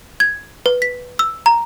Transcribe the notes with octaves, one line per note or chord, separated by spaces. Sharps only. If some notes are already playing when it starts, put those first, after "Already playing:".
G#6
B4
B6
E6
A#5